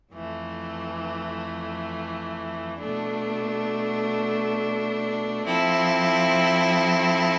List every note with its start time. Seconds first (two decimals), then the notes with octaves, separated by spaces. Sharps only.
0.11 F2 E3 A3
2.78 B2 A3 D4
5.45 F3 C4 E4 A4